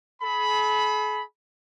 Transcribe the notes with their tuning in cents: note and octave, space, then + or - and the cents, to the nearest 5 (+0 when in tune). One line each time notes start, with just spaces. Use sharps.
G#4 +45 B5 +0